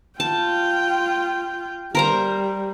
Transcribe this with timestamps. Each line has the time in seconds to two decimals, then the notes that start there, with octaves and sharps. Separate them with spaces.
0.20 F4 G5 A5
1.95 G3 A#4 C5 A#5